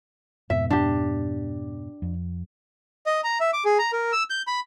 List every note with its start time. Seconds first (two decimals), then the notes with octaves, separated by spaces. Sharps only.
0.50 F2 G#2 B2 E5
0.70 D4 G4
2.02 F2
3.06 D#5
3.24 A#5
3.40 E5
3.53 D6
3.65 G#4
3.79 A#5
3.92 A#4
4.12 E6
4.30 G6
4.47 B5